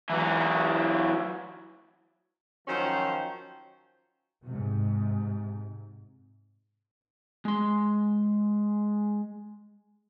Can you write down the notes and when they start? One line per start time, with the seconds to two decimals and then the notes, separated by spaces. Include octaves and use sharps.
0.10 E3 F#3
2.67 D#3 F3 F#3 C#4 C5
4.44 G#2 C3
7.45 G#3 C6